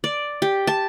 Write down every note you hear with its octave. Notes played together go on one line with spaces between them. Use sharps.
D5
G4
A5